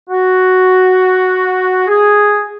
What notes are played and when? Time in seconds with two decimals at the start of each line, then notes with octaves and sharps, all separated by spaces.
0.10 F#4
1.88 G#4